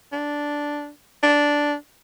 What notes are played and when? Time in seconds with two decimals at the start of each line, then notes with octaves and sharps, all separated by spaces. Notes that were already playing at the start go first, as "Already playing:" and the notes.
0.13 D4
1.23 D4